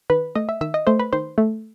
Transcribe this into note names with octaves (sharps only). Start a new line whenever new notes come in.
D#3 B4
A3 D#5
E5
D#3 E5
D#5
A3 C5
B4
D#3 C5
A3